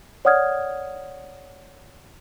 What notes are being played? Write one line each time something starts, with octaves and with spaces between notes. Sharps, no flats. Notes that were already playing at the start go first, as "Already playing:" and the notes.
C#5 D5 F#5 D#6 F6 G#6